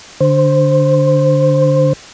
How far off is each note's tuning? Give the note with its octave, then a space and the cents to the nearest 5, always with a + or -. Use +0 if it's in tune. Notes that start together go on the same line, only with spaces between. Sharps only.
D3 +0 C5 +0